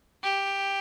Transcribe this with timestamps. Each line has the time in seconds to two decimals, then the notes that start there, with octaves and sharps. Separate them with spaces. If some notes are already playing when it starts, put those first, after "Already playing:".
0.24 G4